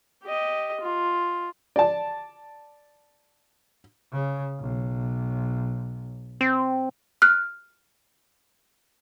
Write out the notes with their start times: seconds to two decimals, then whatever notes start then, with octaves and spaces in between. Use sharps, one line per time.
0.24 G4 D#5
0.81 F4
1.76 D5 A5
4.12 C#3
4.60 B1
6.41 C4
7.22 F6 F#6